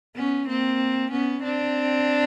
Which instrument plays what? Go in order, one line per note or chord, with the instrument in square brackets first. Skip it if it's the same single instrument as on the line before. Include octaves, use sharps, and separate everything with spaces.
[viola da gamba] B3 C#4
A#3 C4
B3 C#4
C4 D4